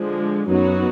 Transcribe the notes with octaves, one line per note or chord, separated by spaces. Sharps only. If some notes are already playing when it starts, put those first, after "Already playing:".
Already playing: D3 F3 G#3
F#2 F#3 B3 D#4 F#4